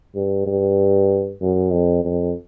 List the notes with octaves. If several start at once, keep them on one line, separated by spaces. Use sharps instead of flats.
G2
G2
F#2
F2
F2